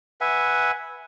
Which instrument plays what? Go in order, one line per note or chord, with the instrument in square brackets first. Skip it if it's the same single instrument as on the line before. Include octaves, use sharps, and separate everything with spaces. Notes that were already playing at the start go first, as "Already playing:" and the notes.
[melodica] B4 E5 F#5 G#5